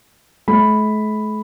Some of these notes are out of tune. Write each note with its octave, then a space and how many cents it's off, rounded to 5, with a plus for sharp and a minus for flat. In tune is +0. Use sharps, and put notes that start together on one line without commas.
A3 -45 B5 +0